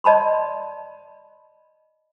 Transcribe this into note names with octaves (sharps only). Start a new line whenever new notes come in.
D5 D#5 A5 B5 C6